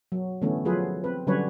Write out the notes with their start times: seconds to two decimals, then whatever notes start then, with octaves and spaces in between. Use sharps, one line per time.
0.12 F#3
0.42 D3 E3 A3 B3 C#4
0.65 F3 F#3 F4 G#4 A4 B4
1.04 C4 B4
1.27 D3 F#3 G3 C#4 B4 C#5